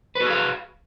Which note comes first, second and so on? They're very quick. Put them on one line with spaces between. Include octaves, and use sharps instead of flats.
B4 F#4 G#4 F5